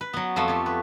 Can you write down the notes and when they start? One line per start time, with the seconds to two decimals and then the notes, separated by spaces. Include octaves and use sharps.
0.01 B4
0.13 F#3 B3
0.36 F2 F3 A3 B3
0.48 G4 C#5
0.66 B4